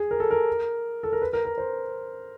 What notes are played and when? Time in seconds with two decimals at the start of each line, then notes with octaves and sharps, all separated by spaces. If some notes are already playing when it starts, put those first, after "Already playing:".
Already playing: G#4
0.11 A#4
0.20 A4
0.31 A#4
1.03 A4
1.12 A#4
1.22 B4
1.33 A#4
1.45 A#4
1.58 C5